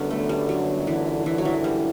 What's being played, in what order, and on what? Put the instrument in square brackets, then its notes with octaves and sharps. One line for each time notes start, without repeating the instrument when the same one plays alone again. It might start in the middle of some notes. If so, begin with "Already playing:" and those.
Already playing: [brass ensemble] G1 F#2 D3 [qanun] B3 C#4
[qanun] A3
G3
F#3
E3
E3
F#3
E3
G3